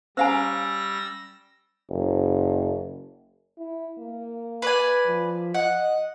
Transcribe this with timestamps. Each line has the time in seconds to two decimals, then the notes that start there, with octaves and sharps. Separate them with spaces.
0.17 G3 C#4 C5 F5 G#5 A#5 E6 A#6
1.90 F#1
3.58 E4
3.98 A#3
4.62 B4 D5 G#5
5.06 F3
5.54 D#5 F#5